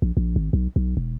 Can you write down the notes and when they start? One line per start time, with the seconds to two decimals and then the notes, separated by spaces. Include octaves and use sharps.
0.02 A#1
0.17 A#1
0.36 G#1
0.53 B1
0.76 B1
0.97 E1